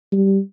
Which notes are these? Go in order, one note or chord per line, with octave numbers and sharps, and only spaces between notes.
G3